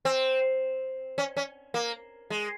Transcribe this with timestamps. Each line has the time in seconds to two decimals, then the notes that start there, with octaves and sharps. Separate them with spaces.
0.05 C4
1.18 C#4
1.37 C#4
1.74 A#3
2.30 G#3